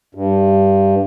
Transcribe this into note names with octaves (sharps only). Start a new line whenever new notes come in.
G2